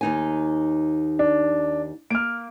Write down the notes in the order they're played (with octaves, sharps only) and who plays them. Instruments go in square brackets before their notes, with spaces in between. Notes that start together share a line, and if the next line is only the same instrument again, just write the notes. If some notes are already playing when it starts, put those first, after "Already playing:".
[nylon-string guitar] D#2 D#4 G#5
[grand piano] D4
[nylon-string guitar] A#3 [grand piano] F6 D7